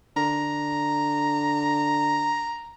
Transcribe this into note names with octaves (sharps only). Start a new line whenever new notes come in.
D3 A#5